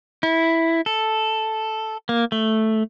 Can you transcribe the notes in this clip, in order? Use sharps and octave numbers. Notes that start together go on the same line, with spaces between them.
E4
A4
A#3
A3